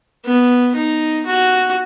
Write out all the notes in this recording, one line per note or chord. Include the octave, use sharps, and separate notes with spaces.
B3
D#4
F#4